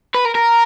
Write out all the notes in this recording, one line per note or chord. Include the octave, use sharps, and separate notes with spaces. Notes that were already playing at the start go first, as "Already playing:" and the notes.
B4
A#4
A#4